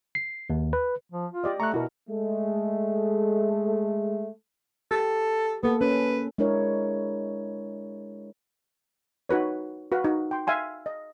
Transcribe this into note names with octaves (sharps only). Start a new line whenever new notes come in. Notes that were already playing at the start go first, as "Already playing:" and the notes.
C7
D#2
B4
F3
F4
G4 D5 D#5
A3 A#5 C#6 F#6
B2 E4 F#4 A#4
G#3 A3
G4 A4
A#3 B3 A4
C#4 B4
G#3 D4 E4 A#4 C#5
D#4 F#4 B4 C#5
F#4 B4 F5
D#4 F#4
G5 C6
E5 F5 G#5 C6
D#5